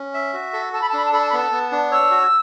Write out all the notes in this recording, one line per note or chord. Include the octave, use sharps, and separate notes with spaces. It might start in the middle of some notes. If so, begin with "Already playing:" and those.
Already playing: C#4
E5
F#4
A4
A4 A5
B5
A5
D4 B5
A5
A4 B5
A5
B5
B3 A5
B3
D4
C#5 E6
F#4